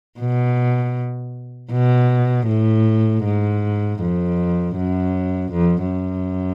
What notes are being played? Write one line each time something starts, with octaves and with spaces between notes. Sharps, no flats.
B2
B2
A2
G#2
F2
F#2
F2
F#2